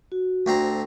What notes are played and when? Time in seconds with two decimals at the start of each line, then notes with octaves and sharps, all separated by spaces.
0.12 F#4
0.46 D2 C4 A#5